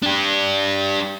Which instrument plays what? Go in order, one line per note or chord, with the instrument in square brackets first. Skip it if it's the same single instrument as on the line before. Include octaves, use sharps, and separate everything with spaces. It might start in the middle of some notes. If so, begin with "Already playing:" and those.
[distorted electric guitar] D4 G4